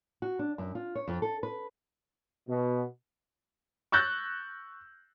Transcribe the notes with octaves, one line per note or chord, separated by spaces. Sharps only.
F#4
D4
F#2
F4
C#5
F2
A4
B4
B2
C#6 E6 F#6 G6 A6 A#6